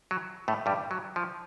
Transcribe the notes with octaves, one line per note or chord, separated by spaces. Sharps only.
F#3
A2 A3
G2 G3
F#3
F3